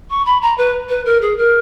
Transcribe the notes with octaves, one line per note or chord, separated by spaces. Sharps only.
C#6
B5
A#5
B4
B4
A#4
G#4
A#4